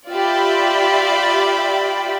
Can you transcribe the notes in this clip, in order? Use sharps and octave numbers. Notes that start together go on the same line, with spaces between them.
F4 G4 D5 E5 G5 B5